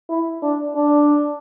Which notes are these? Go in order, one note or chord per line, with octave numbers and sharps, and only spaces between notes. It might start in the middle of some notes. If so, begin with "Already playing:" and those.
E4
D4
D4